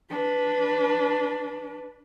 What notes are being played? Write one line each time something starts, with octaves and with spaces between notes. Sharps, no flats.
D4 B4